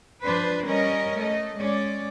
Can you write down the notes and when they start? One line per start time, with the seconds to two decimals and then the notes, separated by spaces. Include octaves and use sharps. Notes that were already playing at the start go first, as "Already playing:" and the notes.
0.24 F3 D4 B4 C5
0.66 G3 C#4 A#4 D#5
1.17 A3 D#5
1.58 G#3 C#4 D5